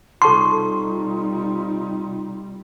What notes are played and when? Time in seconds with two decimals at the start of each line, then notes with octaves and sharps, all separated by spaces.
0.22 C3 G3 D#4 F4 A4 A5 C6 C#6